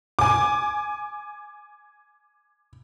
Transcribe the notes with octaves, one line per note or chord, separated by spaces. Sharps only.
G#5 D6